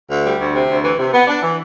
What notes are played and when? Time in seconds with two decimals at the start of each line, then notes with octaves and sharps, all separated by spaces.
0.10 D2
0.24 G3
0.38 D2
0.53 C3
0.68 D2
0.83 E3
0.98 C3
1.12 B3
1.27 D4
1.42 E3